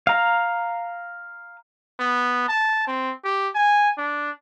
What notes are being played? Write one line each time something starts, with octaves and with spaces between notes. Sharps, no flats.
F5 A#5
B3
A5
C4
G4
G#5
D4